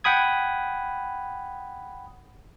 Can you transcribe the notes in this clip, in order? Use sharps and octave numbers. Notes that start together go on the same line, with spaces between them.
F#5 G5 B5 D#6 G#6